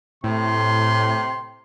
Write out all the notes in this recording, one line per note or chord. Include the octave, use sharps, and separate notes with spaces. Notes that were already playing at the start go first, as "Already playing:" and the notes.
A2 C3 C6